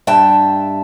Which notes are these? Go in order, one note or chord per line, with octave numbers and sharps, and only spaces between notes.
G2 E5 G5 A5